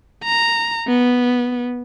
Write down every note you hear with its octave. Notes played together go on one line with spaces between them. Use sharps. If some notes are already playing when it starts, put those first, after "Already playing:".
A#5
B3